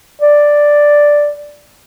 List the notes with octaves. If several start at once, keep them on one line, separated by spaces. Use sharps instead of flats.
D5